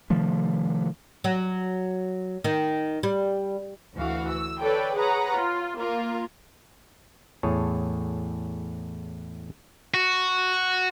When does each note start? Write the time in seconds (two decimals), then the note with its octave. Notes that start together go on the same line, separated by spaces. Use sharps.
0.10 C3 D#3 F3 A3
1.24 F#3
2.44 D#3
3.03 G3
3.95 D2 E3 F#4 F5
4.30 E6
4.61 A4 B4 C#5 D5 G5
4.95 G#4 B4 C#5 F#5 A#5
5.37 F4
5.78 A#3 F4 A#4
7.43 E2 A2 G#4 C#5 A5
9.94 F#4